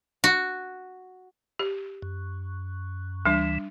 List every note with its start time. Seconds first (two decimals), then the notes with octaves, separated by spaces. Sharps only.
0.24 F#4
1.59 G4
2.02 F#2
3.26 D2 E3 G3 D4